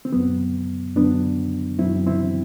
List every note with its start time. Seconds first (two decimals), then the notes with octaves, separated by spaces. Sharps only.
0.05 C4
0.13 F#2 F#3 B3
0.96 F#2 F#3 B3 D4
1.79 F#2 F#3 C4 E4
2.07 C4 E4